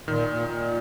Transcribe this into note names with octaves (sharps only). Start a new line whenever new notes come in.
A#2 D#3
A#2
A#2